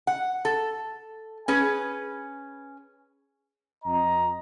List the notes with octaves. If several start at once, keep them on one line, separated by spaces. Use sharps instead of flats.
F#5
A4
C#4 G#4 B4
F2 D#5 A#5